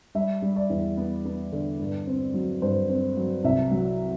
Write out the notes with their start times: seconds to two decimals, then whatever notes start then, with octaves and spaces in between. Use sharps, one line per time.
0.15 G3 E5
0.42 G3
0.56 D5
0.70 E2
0.97 B3
1.25 B3
1.52 D3
1.80 G2
2.07 C4
2.34 F#3
2.62 G2 C5
2.89 C4
3.17 F#3
3.44 C2 E5
3.71 F#3